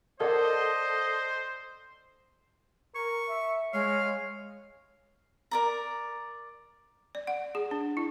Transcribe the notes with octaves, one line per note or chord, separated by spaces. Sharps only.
A4 A#4 C5 D5 D#5 F#5
A#4 C#6
E5
G#3 C#5 F5
A#4 D5 A#5
D5
F#5
G#4
D4
E4